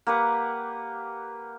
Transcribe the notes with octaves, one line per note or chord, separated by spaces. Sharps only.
A#3 G4 B4 F#5